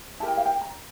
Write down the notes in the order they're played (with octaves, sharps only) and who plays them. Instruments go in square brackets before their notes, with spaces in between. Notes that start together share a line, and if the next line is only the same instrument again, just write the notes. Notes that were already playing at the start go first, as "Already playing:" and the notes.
[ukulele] E4 G4 A#4 A5
G5
F5
G5
A#5